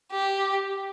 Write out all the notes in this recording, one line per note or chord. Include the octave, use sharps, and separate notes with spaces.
G4